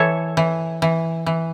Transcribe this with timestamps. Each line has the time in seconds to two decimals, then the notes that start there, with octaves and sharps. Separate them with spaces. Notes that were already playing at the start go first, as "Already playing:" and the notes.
Already playing: E3 A4 C#5
0.37 E3
0.82 E3
1.26 E3